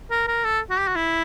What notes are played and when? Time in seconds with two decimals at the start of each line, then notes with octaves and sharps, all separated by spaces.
0.10 A#4
0.27 A#4
0.44 A4
0.70 F#4
0.79 G4
0.88 F#4
0.95 E4